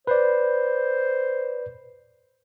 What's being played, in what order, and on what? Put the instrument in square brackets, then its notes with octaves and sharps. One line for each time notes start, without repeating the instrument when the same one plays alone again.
[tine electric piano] B4 D5 [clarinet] C5